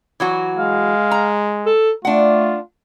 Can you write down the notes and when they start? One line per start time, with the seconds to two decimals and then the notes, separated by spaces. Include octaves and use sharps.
0.20 E3 F#3 F#4
0.56 G#3 F5
1.11 A#5
1.66 A4
2.05 A3 D4 F4 F#5